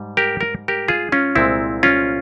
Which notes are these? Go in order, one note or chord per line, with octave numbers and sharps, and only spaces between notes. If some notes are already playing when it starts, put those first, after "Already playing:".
Already playing: G#2 G3
G4 A#4
A#4
G4 A#4
F4 G#4
C#4 F4
C2 A#2 G#3 C4 E4
C#4 F4